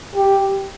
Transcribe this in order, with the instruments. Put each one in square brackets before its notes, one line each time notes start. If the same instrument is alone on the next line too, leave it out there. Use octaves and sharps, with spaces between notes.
[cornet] G4